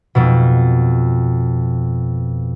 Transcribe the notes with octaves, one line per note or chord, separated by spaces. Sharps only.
F2 B2